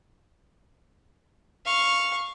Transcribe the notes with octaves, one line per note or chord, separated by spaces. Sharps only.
F5 C#6